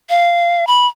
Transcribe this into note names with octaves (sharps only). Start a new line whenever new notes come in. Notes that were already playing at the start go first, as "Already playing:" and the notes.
F5
B5